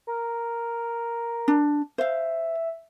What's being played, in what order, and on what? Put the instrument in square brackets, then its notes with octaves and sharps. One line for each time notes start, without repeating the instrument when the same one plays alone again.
[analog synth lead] A#4
[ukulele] D4
[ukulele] C5 F5 [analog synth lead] E5